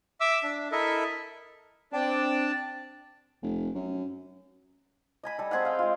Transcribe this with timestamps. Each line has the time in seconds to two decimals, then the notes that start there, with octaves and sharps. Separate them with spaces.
0.21 E5 D6 E6
0.43 D4
0.72 E4 A4 A#4 D#5 E5
1.93 C4 D4 D5 G5 A5
3.43 F1
3.75 F#2
5.23 D#5 G#5 B5
5.38 G3 A4
5.51 C4 G#4 D#5 F#5
5.65 F5 G5
5.79 G#3 F4